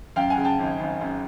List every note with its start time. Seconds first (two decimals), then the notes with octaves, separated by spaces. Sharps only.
0.16 F#2 F5 G5
0.30 F#5 G#5
0.37 C#3
0.44 G5 A5
0.59 G#1
0.79 G#1
1.01 F#2